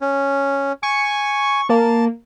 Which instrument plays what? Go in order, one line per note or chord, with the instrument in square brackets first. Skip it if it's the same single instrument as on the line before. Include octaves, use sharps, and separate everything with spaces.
[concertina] C#4
[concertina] G#5 [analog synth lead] C#6
[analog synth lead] A#3 [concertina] A5